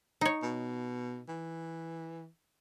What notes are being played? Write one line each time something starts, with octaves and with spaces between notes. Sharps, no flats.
D#4 C#5
B2
E3